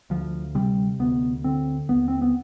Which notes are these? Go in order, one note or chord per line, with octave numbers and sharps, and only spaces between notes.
D2 F3
C3 G3
D2 B3
D3 C4
D#2 B3
C4
B3